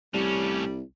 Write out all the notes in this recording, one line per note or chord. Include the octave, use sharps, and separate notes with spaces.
C2 A2 G3 C#4